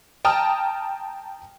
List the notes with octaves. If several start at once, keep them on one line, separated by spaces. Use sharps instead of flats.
G5 A5 A#5 D#6 F6